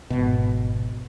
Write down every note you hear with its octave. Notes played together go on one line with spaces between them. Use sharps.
G#1 F2 B2